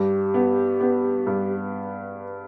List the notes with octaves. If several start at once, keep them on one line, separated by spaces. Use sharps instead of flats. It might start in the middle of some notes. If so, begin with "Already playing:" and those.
Already playing: G2 G4
B3
B3
G2